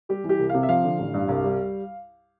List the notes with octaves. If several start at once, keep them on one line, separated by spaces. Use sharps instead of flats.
G3 G4
E3
G4
C2
C3 F5
E5
F3 F5
D3
A1
G2
C2
G3